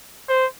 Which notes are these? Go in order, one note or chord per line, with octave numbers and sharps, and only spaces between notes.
C5